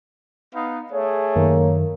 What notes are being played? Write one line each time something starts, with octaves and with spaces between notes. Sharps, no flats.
B3 D#4 F5
A3 G#4 C#5
F#2 D#3 A#3